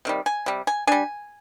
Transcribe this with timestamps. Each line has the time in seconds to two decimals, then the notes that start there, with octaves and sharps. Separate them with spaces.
0.05 C3 D#3 G3
0.26 G#5
0.46 C3 G3
0.67 G#5
0.87 G3 D4 G#5